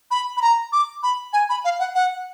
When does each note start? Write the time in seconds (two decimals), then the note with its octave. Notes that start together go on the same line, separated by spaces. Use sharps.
0.11 B5
0.37 B5
0.42 A#5
0.72 D6
1.03 B5
1.33 G#5
1.49 B5
1.64 F5
1.79 F#5
1.95 F#5